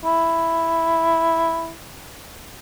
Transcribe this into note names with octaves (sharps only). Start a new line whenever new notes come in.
E4